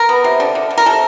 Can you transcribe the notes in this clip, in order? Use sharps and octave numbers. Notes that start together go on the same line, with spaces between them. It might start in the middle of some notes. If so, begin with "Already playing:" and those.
Already playing: A#4
B3
C3
D3
D3
D3
A#4
C3 A4